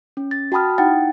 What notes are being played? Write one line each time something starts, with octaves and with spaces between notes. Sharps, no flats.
C#4
A6
F#4 G5 A5 B5 D#6 F6
D#4 E4 F#5 G5 A6